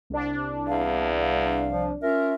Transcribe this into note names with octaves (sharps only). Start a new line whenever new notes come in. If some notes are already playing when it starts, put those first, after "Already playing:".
C2 D4
E2 F5
F5
F3
C#4 F4 A#4 E5